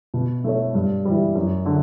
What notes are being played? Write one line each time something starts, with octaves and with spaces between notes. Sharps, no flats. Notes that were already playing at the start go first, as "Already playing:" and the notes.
B2
A3 E4 A4 C#5
G2
E3 G3
F#2
D3